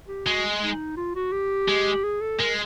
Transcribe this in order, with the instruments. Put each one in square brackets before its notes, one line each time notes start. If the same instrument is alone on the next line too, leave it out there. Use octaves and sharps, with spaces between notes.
[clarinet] G4
[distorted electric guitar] G#3 [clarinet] F#4
[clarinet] D#4
F4
F#4
G4
[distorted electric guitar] G#3
[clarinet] G#4
A4
[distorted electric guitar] G#3 [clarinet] A#4